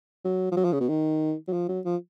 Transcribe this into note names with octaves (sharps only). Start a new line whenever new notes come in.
F#3
F3
F#3
F3
C#3
B2
D#3
F#3
F3
F#3
F3